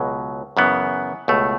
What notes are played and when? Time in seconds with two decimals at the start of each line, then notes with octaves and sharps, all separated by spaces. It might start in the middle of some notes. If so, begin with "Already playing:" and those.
Already playing: C#2 B2 F#3
0.57 F#2 C#3 E3 B3
1.28 C#2 B2 A3